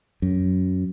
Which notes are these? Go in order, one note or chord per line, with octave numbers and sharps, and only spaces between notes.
F#2